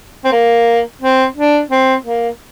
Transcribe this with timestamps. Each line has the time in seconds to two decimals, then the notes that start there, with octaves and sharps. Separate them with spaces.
0.25 C4
0.32 A#3
1.02 C4
1.36 D4
1.71 C4
2.05 A#3